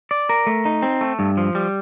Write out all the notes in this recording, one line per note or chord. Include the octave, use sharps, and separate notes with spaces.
D5
A#4
A3
D#4
C4
A3
G2
F3
G3